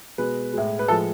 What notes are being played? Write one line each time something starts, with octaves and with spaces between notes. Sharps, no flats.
B2 G#3 B4
A2 G#3
B4
A2 F3 G#3 A4